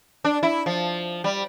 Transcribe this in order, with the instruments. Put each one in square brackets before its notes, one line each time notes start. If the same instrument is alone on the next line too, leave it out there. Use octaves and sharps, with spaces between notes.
[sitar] D4
E4
F3
G3